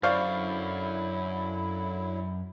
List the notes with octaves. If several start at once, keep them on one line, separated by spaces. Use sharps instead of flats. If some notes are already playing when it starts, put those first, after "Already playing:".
F#2 D3 F#3 E4 C5 D5 F5 C#6